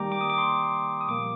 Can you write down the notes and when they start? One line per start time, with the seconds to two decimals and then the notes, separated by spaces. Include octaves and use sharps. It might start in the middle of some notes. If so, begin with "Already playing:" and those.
Already playing: D#3 G3 A#3 G5 A#5 D6
0.12 D6
0.21 D#6
0.30 D6
0.38 C6
1.01 D#6
1.08 A#2 F3 A#3 D6